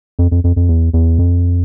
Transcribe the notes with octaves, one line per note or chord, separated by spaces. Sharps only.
F2
F2
F2
F2
E2
E2
F2